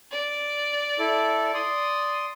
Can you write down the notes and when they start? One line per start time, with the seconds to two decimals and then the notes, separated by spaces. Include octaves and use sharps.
0.12 D5
0.99 E4 A4
1.54 D5 C6 D#6